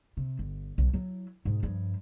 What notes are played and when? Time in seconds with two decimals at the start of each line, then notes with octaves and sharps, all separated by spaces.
0.17 C3
0.39 G1
0.78 B1
0.94 F#3 E4
1.45 G#2 B2
1.63 G2 F3